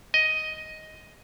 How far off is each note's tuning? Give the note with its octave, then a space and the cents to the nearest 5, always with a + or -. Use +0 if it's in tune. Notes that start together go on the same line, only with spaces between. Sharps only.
D#5 +5